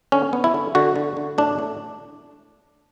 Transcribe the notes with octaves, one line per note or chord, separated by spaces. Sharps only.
D3 C#4
B3
E4
D3
D3 F#4
D3
D3
A2 D4
A2